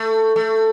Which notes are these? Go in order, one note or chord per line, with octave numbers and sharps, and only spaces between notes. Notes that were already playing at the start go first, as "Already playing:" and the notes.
Already playing: A3
A3